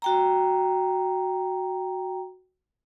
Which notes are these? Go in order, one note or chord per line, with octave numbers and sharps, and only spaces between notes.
F#4 G5 A#5